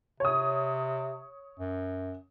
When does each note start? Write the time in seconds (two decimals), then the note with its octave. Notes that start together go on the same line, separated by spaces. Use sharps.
0.20 C3 C#5 D#6
1.59 F#2